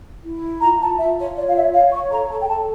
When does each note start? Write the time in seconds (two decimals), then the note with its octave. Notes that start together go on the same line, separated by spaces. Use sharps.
0.24 E4
0.61 F4 A#5
0.81 A5
0.99 F4 E5
1.18 C#5
1.37 C#5 D5
1.47 F5
1.54 E5
1.73 C#5 F5
1.92 C#6
2.10 A4 A#5
2.30 A5
2.41 G5
2.47 A4 A5